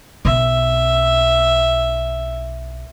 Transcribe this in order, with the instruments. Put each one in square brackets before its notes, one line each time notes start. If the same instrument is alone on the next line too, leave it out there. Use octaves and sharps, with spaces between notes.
[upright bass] B1 [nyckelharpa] E5